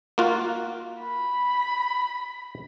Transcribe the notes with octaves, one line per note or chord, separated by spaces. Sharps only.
A#3 F4 F#4
B5